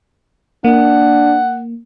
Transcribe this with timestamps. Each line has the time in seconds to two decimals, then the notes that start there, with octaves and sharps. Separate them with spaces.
0.65 A#3 D4 F#5